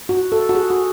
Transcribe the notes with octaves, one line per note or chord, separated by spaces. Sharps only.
F#4
A4
F#4
G#4
F#4